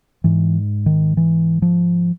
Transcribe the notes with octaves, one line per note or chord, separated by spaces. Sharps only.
G#2 E3
D#3
E3
F3